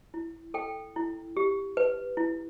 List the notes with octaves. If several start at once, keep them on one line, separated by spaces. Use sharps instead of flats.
E4
A4 G5
E4
G4
B4
E4